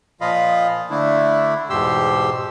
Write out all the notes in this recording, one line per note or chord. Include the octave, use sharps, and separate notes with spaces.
A#2 F3 F4 D#5 F5 B5
D3 A3 D4 E4
E2 G#2 B2 G4 C6 E6